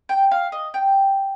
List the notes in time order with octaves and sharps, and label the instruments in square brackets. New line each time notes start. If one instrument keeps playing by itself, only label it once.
[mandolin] G5
F5
D#5
G5